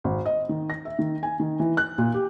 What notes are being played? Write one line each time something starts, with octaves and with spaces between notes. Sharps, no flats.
G#1
D#5
D#3
A#6
E5
D#3
G#5
D#3
E3
F#6
A#2
G4